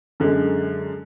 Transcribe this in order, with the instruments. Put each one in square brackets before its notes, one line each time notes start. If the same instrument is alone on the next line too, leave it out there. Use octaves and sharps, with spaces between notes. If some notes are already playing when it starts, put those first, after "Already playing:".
[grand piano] F#2 D3 G#3